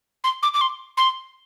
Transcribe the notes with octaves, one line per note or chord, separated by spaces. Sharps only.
C6
D6
D6
C6
C6